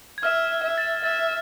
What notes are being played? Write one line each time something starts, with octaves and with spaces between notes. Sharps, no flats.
G#6
E5 F6
E5
A6
E5 A6